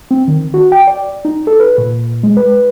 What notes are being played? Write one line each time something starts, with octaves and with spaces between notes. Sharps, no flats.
C4
D#3
F#4
G5
D5
D#4
A4
B4
A#2
G#3
B4